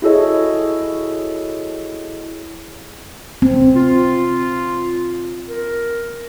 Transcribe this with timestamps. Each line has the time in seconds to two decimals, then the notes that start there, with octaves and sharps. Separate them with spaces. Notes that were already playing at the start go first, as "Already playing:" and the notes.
0.02 E4 F#4 G#4 A4 C#5 D#5
3.42 C4
3.76 F4
5.48 A#4